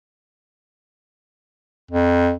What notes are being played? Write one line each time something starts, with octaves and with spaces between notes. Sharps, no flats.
F2